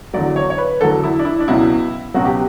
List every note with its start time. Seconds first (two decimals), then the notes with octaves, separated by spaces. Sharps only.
0.14 E2 D3 F#3 D5
0.36 C#5
0.50 C#5
0.58 B4
0.81 E2 D3 F#3 A4
1.04 E4
1.19 D4
1.25 E4
1.40 D4
1.48 C#2 B2 F#3 E4
2.14 C#2 B2 F#3 F#4
2.25 G4